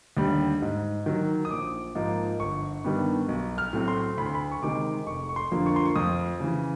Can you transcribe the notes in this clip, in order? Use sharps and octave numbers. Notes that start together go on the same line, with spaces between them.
D#2 D3 G3
G#2
D#3 F#3
D#6
A#1 D6
G#2 F3 A#3 D#4
G1 C#6
G2 D#3 G3 B3
B1
F6
A2 F#3 A3 C4
C6
D2 B5
C6
B5
C#6
C3 D#3 G#3 D6
F1 C#6
C#6
C6
F2 D3 F3 A#3
C#6
C6
C#6
F2 D#6
C#3 E3